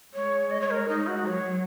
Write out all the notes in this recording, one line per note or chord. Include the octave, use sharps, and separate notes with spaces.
G#3 C#5
D#5
C#5
A#4
D#4
F#4
F#3 C#5